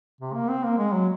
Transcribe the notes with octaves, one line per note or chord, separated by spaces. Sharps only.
C3
A#3
C4
A#3
G#3
F#3